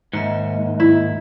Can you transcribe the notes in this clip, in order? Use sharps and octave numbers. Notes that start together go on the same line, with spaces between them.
D#2 G#2 A#3 D#5 E5
E4